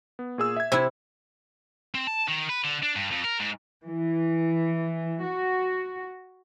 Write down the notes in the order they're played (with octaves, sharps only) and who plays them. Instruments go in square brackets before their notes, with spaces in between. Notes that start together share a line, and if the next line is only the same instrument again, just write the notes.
[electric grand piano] B3
A#2 G#4 E6
E5 G#6
[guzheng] C3 E4 [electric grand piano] E6
[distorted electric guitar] C4
A5
D#3
B4
D3
D4
G2
F2
A#4
G#2
[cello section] E3
F#4